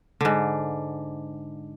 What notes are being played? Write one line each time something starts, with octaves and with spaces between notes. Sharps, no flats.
G#2 D3